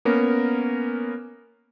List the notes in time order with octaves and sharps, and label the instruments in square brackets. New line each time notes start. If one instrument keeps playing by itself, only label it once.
[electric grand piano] A#3 B3 C#4 A#4